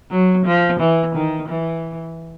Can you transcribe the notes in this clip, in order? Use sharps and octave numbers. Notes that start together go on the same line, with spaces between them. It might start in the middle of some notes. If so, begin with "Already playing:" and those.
F#3
F3
E3
D#3
E3